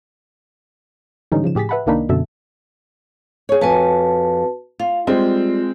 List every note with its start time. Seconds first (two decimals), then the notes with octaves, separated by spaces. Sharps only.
1.32 G#2 D3 E3 G3 C#4 D#4
1.44 C#3 F3 E7
1.55 A2 G4 G#4 A6 B6
1.69 B4 E5 F#5 A5 B5
1.86 C2 D#3 A#3 D4 D#4 B5
2.09 F#2 B2 D3 E5 A5
3.49 G#4 C#5
3.61 F2 F#4 B4 G#5 A5
4.80 F4 F5
5.07 G3 G#3 C4 F4